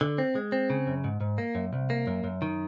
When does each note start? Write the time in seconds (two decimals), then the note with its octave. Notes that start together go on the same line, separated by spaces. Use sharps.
0.01 D3
0.18 C4
0.35 G#3
0.52 C4
0.70 C#3
0.87 F#2
1.04 G#2
1.21 G#2
1.38 A#3
1.55 F#2
1.73 C2
1.90 A#3
2.07 F#2
2.24 F#2
2.42 D#3